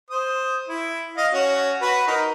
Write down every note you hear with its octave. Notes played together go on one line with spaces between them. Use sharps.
C5 D#6
E4
D#5 F5
C#4 F#4 C#5
F#4 B4
D#4 A#4